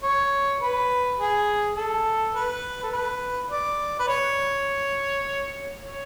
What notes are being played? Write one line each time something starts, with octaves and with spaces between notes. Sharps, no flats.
C#5
B4
G#4
A4
B4
A4
B4
D5
B4
C#5
C#5